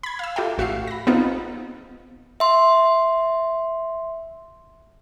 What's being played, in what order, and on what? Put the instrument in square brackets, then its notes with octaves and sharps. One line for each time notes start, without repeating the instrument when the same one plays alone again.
[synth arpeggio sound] B5 G#6
F5 E6
F4 G4 A4 E5 G5
A1 F#4 E5 F5 C7
B5 A#6
B3 C4 D#4 F4
[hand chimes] E5 C6